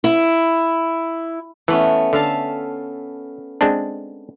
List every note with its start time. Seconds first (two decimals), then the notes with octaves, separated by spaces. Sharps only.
0.04 E4
1.68 E3 A3 B3 C#4
2.13 D3 E5 F5 A5
3.61 G#3 C4 D4